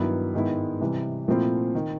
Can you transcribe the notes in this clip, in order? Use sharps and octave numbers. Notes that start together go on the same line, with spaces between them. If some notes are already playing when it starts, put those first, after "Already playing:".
Already playing: G2 D#3 F#3 B3 E4
G#2 D#3 G#3 B3 E4
C3 E3 G3
A#2 F3 A3 C4 E4
D#3